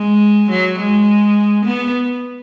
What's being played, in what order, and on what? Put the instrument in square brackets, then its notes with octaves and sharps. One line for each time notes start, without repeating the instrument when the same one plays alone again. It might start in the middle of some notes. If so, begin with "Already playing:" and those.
Already playing: [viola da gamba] G#3
F#3
G#3
B3